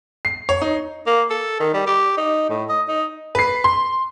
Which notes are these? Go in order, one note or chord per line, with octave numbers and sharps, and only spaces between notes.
C7
C#5
D#4
A#3
A4
D#3
G3
G4
D#4
A2
D#5
D#4
B4 C7
C6